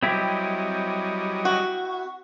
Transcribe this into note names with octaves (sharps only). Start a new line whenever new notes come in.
F#3 G3 C4 E4 G4 D#5
F#4